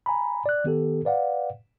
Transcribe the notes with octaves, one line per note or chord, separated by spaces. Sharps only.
G#5 A#5 B5
D5 F#6
D#3 B3 G4 A4
B4 D5 F5 F#5